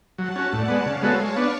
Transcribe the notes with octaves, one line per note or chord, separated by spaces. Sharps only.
F#3 F#5 A5
C#4 F#4
A2 D5 F#5
G#3 B3
C#3 C#5 F5
G#3 B3 F#4 A4
G#3 A5 C#6
B3 D4